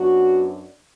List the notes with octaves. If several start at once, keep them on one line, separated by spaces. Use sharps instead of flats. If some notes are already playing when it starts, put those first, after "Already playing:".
Already playing: F#2 F#3 B3 D4 F#4